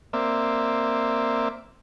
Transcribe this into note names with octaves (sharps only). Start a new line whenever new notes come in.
A#3 C4 D5 E5